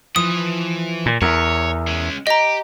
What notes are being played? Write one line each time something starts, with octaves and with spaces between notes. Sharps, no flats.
E3 F3 B4 D#6
A#2
E2 A#4 C#5
G#3 C#4
G4 D#5 A#5